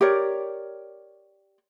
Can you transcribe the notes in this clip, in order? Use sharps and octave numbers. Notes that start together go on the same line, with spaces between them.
G4 A#4 C#5 D5